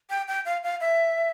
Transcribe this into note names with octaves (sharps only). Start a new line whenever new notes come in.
G5
G5
F5
F5
E5